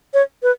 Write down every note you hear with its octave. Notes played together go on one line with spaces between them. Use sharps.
C#5
B4